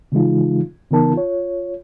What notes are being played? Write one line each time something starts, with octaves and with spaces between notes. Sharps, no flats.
C#3 E3 F3 G#3 D#4 F4
C#3 E3 B3 D#4 A#4 A5
F4 C#5